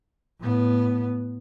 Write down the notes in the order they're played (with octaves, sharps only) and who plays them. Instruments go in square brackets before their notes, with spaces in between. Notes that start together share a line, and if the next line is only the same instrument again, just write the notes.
[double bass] A2 B3